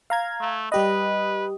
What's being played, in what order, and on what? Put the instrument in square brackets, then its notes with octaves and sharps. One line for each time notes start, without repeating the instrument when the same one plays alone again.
[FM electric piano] F5 A#5 G#6
[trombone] A3
[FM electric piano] G3 G4 D#5 [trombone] B4